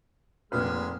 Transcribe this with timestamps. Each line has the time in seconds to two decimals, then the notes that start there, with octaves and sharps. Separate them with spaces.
0.52 F1 A#2 G#3 B4 F6